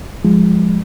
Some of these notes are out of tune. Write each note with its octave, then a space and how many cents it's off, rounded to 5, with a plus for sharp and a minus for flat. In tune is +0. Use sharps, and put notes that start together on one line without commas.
F3 +0 G#3 -20